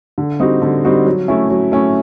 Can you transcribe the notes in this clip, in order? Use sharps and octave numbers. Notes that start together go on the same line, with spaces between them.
D3
G3 C4 D#4 F#4
D3
G3 C4 D#4 F#4
F#3
A3 C#4 E4
F#3
A3 C#4 E4